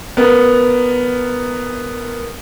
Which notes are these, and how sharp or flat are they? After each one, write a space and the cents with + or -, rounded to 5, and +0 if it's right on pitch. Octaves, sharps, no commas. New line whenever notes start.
B3 +0 A#4 +0